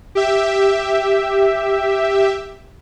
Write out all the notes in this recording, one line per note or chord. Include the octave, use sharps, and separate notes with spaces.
G4 E5